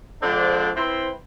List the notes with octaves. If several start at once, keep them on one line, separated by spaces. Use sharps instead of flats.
D3 F3 G#3 C4 D4
C4 E4 B4 C5